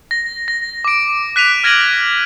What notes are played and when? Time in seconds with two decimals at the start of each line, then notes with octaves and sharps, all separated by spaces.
0.11 A#6
0.48 A#6
0.85 D6 D7
1.36 F#6 B6 D#7 F7
1.64 F6 G#6 A#6 D7 D#7 F#7